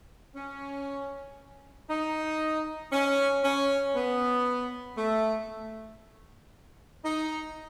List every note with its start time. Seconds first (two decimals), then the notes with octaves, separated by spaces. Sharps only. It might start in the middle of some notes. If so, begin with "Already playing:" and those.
0.35 C#4
1.89 D#4
2.92 C#4
3.43 C#4
3.95 B3
4.97 A3
7.03 D#4